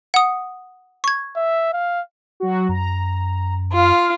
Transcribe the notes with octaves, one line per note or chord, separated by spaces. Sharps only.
F#5 D#6
C#6 G#6
E5
F5
F#3 F#4
F#2 A#5
F4 F5